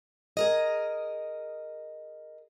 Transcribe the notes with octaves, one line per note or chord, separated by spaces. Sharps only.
G#4 A#4 D#5